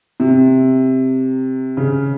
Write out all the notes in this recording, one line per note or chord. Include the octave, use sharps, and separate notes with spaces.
C3
C#3